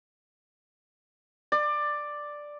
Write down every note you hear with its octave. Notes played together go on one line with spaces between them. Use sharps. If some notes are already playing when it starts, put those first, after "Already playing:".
D5